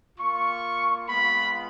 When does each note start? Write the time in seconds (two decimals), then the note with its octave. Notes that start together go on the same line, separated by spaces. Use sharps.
0.19 A#3 F4 C#6
1.08 G#3 B3 F4 B5